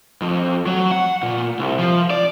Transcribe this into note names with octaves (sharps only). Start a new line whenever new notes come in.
F2
F#3
F#5
A#2
C2
F3
D5